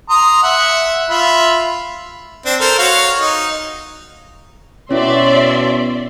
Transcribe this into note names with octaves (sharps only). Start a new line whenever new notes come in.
A#5 C6 D#6
E5 F#5
F4 E5 B5
C4 D4
A4 A#4 C5
F#4 C#5 F5
D#4
B2 C#4 E4 C#5 D5 E5 C6